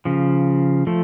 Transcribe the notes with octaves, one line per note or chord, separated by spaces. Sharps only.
C#3 F3
F3 A3